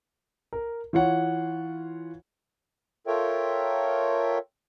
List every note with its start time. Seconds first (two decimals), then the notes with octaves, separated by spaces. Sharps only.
0.53 A#4
0.93 E3 F4 C#5 F#5
3.07 F4 A4 A#4 C#5 E5 G5